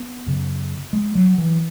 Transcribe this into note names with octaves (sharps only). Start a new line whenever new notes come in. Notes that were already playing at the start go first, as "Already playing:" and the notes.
Already playing: B3
F#2 C#3
G#3
F#3
E3